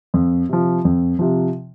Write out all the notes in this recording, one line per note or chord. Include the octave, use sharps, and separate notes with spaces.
F2
C3 F3
F2
C3 F3